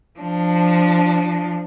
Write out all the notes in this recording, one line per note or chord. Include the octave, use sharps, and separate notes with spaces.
F3 D4